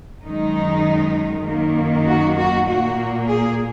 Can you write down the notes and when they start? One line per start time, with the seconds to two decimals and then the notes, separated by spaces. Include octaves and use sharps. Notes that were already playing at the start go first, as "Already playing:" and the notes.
0.23 F#2 D#3 G#3 D#4
1.45 F#2 D#3 A#3
2.06 F#4
2.36 F#4
2.67 A#2 A#3 F#4
3.27 G#4